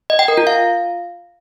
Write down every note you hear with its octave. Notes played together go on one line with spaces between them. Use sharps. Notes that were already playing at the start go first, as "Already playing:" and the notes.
D#5
G5
A#4
F4
F5